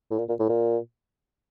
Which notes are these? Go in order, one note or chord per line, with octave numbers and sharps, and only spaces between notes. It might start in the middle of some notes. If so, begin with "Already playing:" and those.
A2
A#2
A#2
A2
A#2